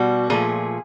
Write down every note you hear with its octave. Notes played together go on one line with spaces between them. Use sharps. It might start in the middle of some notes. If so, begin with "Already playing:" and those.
Already playing: B2 G3 F#4
A#2 F3 A3 G#4